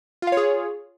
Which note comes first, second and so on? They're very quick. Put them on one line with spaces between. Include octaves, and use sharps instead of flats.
F4 F5 C#5 G#4